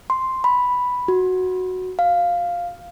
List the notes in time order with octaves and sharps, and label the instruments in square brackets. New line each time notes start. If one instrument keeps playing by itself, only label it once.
[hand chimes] C6
B5
F#4
F5